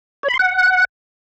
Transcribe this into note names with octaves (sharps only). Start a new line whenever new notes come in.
C#5
B5
C6
F#5